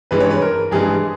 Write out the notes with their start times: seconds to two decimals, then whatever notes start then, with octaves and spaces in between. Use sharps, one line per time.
0.11 G2 E3 G#3 B4
0.20 C#5
0.30 B4
0.42 A#4
0.71 G2 E3 G#3 G#4